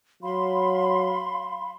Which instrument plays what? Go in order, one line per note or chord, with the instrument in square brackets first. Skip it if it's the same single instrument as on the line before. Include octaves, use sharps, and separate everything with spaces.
[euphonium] F#3 [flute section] F5 B5 C6